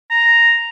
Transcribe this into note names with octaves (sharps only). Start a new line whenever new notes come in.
A#5